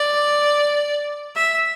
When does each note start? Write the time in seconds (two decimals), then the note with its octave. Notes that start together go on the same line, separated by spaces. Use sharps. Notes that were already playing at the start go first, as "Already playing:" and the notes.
Already playing: D5
1.35 E5